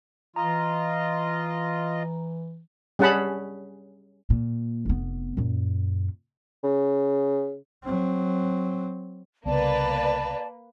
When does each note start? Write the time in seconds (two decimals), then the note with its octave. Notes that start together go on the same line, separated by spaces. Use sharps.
0.36 E3 F4 D#5 A#5
2.99 G3 C#4 G#4 F#5 A5 B5
4.30 A#2
4.85 F1 B3
5.37 F#2 A#2
6.63 C#3
7.84 F#3 C4
9.46 C2 C#3 A#3 B3 B4 D5 A5